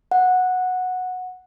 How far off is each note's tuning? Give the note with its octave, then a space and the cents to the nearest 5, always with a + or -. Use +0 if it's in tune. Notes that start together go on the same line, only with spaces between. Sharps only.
F#5 -10